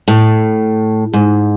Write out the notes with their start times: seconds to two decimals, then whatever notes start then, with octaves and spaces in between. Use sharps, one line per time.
0.08 A2
1.13 G#2